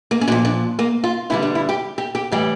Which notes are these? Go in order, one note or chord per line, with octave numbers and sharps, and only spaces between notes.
A#3
C#4
A#2 F3 D4
D4
A#3
F4
G2 D3 G3 E4
D4
E4
G4
G4
G4
A2 E3 G3 G4